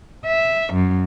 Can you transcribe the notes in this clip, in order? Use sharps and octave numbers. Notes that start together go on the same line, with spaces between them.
E5
F#2